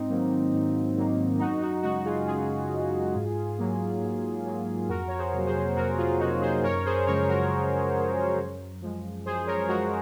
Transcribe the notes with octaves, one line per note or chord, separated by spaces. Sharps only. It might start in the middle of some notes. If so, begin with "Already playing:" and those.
Already playing: G#2 C4 D#4
D#3 F#3 A#3
G#2
D#3 F#3 A#3
F#2 D#4 F#4
D#4 F#4
C#3 G#3 D#4 F#4
F4 G#4
F#2 F4 G#4
C#3 G#3
G#2
F#3 A#3
G#2
F#3 A#3
F2 F#4 A#4
C#5
G#4 C5
C3 F#3 A#3
G#4 C5
F2 F#4 A#4
F4 G#4
C3 F#3 A#3 D#4 F#4
G#4 C5
F#2 A#4 C#5
G#4 C5
C#3 F3 G#3 A#4 C#5
F#4 A#4
F#2
C#3 F3 G#3
F#2
F3 G#3
F#2 G#4 C5
A#4 C#5
F3 G#3 F#4 A#4